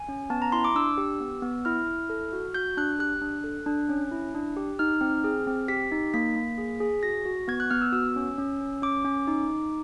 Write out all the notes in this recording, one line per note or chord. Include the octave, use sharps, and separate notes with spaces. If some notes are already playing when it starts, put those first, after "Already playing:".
Already playing: G#5
C#4
B3 A5
A#5
E4 C6
D6
D4 E6
G4
B3
B3
E4 F6
E4
A4
F#4
F#4 G6
D4 F#6
G4 F#6
D4
A4
D4
C#4
E4
D4
G4
D#4 F6
C4
G#4
C4
G4 B6
D#4
A#3 B6
A#3
G#4
G#4
F#4 A#6
F#4
B3 G#6
F#6
B3 F6
E6
F#4 E6
C#4
C#4
C#4
C#4 D6
C#4
D#4
D#4